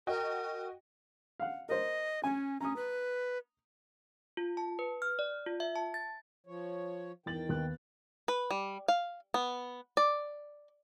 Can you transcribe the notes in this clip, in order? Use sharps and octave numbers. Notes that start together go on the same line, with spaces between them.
F#4 A#4 D#5 G5
F5 F#5
A#4 C5 D#5
C#4 G#5
C#4 A#5 D#6
B4
F4
A5
B4
F6
D5
F4
E5
A5
A6
F3 C#5
E2 D#3 G5 A6 F#7
D#2 B3 F#6
B4
G3
F5
B3
D5